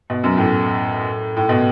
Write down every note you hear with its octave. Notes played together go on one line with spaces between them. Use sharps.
B2
F#2
A2
A2
B2